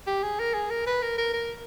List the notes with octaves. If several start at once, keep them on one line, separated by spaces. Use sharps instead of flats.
G4
G#4
A#4
G#4
A#4
B4
A#4
A#4
A#4